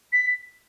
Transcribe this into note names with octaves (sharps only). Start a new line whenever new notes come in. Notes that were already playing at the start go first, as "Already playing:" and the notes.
B6